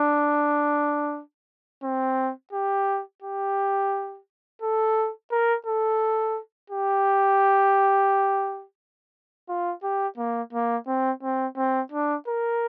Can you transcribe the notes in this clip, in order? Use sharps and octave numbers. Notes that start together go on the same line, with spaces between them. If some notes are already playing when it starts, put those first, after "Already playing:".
Already playing: D4
C4
G4
G4
A4
A#4
A4
G4
F4
G4
A#3
A#3
C4
C4
C4
D4
A#4